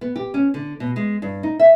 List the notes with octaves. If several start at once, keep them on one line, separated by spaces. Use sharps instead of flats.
B3
G4
C#4
D3
B2
G#3
G2
D#4
E5